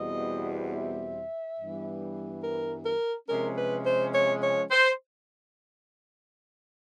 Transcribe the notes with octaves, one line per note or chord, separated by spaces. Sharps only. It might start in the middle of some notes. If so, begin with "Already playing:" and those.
Already playing: E2 B2 G3 C4 D#5
E5
G2 E3 G3 B3
A#4
A#4
C3 F3 G#3 C#4 A#4
B4
C5
C#5
C#5
C5